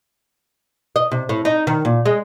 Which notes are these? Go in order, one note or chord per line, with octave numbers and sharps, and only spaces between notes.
D#5
C3
A2
D#4
D#3
A#2
G#3